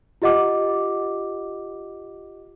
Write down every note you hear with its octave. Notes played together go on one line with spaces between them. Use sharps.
F4 G4 D#5 F#5 D6